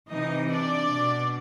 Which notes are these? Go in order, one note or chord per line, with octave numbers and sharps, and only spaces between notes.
C3 E3 D#4 D#5
D4 D5
B2